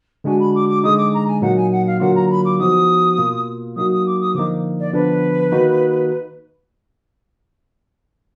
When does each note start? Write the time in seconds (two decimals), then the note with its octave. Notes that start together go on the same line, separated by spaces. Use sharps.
0.24 D3 G#3 D4 F#4 G#5
0.39 B5
0.55 D6
0.68 D6
0.83 D3 G#3 D#4 D#6
0.97 D6
1.13 A#5
1.27 G#5
1.41 A#2 F#3 A#3 D#4 F#5
1.56 G#5
1.71 F#5
1.87 F5
2.00 D3 F#3 A#3 F4 F#5
2.15 A#5
2.30 B5
2.45 D6
2.59 F3 B3 D#4 F#4 D#6
3.18 B2 A#3 F4
3.76 F#3 A#3 D#4 F#4 D#6
3.91 D#6
4.06 D6
4.20 D#6
4.34 D3 F3 A#3 D#4 D6
4.79 D5
4.93 D3 F3 B3 D4 B4
5.52 D#3 A#3 D#4 F#4